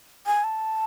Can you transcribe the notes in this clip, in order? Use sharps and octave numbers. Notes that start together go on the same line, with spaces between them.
G#5
A5